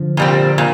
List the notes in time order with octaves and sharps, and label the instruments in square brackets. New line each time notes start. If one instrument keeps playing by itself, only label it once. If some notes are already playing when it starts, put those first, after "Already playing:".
Already playing: [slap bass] D3 F3
[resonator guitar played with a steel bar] A#2 G3 C4
A#2